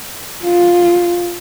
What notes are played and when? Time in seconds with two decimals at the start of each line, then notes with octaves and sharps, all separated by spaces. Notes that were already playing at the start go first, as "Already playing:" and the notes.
0.43 F4